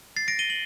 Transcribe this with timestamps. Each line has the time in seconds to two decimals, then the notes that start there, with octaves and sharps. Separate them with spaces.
0.16 A6 C7
0.28 A#6 D7
0.39 D#7 G7
0.50 F#7